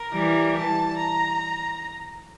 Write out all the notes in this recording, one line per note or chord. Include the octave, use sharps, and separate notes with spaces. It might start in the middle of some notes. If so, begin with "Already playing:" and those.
Already playing: A#4
E3 G3
A5
A#5